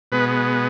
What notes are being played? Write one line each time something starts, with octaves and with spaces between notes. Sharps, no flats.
B2 G#3 B3 B4